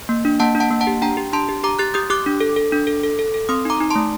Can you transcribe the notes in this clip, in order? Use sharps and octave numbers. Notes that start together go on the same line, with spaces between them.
A#3
D4
A#3 F#5 A5
D4
F#5 A5
A#3
F#5 A5
G4
D4 G5 A#5
G4
D4 A5 C6
G4
G4 A#5 D6
G4 F#6 A6
G4 D#6 G6
G4 D6 F#6
D4
A4
A4
D4
A4
A4
A4
A4
C4 C6 D#6
D#4 A#5 D6
D#4
A5 C6
A3